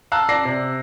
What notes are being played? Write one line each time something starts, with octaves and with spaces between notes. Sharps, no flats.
F5 A5 A#5 E6 F#6
D5 A5 A#6 C7
C3